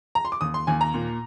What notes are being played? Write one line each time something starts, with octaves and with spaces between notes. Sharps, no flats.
A#5
C6
D6
D#2 D#6
C6
D#2 G#5
A#5
A#2